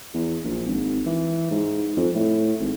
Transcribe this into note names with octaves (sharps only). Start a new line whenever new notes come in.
E2
A#1
G#1
E3
G#2
F2
A2
G#1